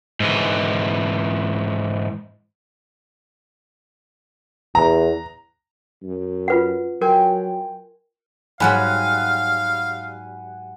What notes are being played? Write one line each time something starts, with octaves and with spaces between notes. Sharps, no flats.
G#2 E3
E2 A#5
F#2
F4 B4 F#5
F#3 A#4 G5 G#5 C6
G#2 F#3 G3 F5 F#5 G#5 B5